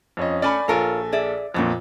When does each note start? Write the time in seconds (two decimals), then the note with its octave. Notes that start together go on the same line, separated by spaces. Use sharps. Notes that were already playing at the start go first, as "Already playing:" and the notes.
0.17 F2 C#4 D#5
0.42 A3 C#4 D5 G#5 B5
0.68 A#1 F4 A4 A#4 C#5 G#5
1.12 G#4 D5 E5
1.54 F2 A#2 D3 F#3 B3